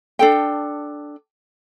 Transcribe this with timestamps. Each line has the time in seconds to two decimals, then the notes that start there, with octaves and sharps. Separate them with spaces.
0.19 D4 A4 G5